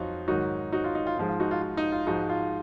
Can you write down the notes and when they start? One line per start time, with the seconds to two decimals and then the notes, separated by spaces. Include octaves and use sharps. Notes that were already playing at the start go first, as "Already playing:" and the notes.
Already playing: F2 F#3 D#4 F4 F#4
0.28 G#2 D#3 F#3 D#4 F#4
0.72 D#4 F#4
0.84 F4
0.95 D#4
1.07 F4
1.17 G#2 F3 G#3 F4
1.28 F4
1.40 D#4 F#4
1.51 F4
1.62 F4
1.77 D#4
1.92 F4
2.07 G#2 F3 G#3 D#4 F#4
2.29 F4